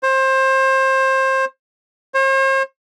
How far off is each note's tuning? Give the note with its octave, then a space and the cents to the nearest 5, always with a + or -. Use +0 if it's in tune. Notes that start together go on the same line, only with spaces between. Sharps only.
C5 +25
C5 +45